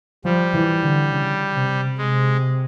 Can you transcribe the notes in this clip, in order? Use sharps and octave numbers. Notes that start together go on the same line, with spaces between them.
F3 G3
E3
D3
C#3
C3
C3 G#3